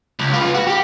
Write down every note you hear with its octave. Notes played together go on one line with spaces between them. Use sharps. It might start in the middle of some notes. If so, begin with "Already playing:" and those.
C#2
F4 B4
F#4
G4